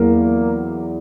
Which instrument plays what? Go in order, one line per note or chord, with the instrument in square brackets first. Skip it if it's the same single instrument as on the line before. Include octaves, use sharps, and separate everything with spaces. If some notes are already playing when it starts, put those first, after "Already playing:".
Already playing: [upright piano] E2 F#3 A#3